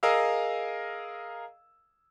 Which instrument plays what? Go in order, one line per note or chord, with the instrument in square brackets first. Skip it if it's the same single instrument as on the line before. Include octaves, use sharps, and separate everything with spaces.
[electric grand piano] G#4 A#4 D#5 F5 E6